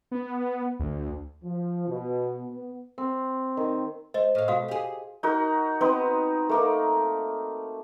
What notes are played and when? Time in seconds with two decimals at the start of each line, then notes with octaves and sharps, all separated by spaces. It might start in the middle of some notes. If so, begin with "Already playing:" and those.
0.11 B3
0.79 D2
1.44 F3
1.87 B2
2.48 B3
2.98 C4
3.57 D#3
4.14 C5 D#5
4.35 A2 F5
4.48 B2 F#4 F5 D#6
4.68 G4 G#4
5.23 D#4 F#4 A#4
5.81 B3 C4 D#4 B4
6.49 A3 A#3 D#4